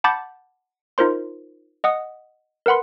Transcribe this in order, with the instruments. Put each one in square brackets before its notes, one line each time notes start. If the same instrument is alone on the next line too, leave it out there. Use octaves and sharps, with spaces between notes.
[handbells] F#5 A5 B5 D6 G6 A6
D#4 F4 A#4 C5 C6
D#5 F#5 D#6
A#4 B4 F#5 B5 C6